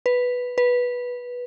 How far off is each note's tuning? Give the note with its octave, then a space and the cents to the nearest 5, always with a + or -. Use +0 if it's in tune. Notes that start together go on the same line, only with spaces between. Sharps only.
B4 +0
B4 -10